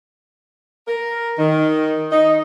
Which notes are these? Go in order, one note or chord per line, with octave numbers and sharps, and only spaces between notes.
A#4
D#3
D#4